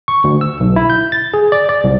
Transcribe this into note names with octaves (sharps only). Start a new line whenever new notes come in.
C#6
D2
E6
B1
E4
G6
A6
G#4
D5
D5
C2